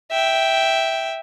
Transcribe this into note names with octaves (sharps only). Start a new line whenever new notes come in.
E5 G5